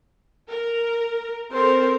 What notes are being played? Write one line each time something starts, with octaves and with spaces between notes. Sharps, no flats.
A#4
C4 A4 A#4 C5